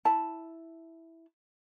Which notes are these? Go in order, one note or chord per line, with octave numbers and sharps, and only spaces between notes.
E4 A5